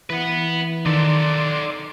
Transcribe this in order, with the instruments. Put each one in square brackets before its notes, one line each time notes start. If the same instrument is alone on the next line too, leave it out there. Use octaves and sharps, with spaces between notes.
[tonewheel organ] E3 [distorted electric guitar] B4 F#5
[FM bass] D#3 [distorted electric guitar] D#4 A4 [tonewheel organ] D5 C6 D6